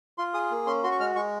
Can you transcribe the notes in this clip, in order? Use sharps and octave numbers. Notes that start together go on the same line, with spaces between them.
F4 C6
G#4 D#6
A#3
C#4 C6
F#4 C6
C#6
G#3 F6
G#3 C#6